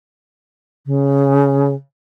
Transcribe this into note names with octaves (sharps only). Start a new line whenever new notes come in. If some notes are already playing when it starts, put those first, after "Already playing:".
C#3